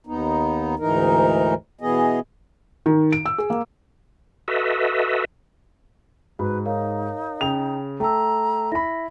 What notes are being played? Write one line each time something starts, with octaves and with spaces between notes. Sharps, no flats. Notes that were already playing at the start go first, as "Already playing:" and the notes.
D#2 B3 D#4
D2 G#2 E3 D#4 A#4
B2 E3 B3 G#4 D#5
D#3
D7
E6
G#4
A#3
F#4 A4 B4 D#5 E5
G#2 F#4 B4 B5
D#4 A#4 C#5 F5
C#3 G5 F7
A3 G5 A5 A#5 E6
E4 B5 A#6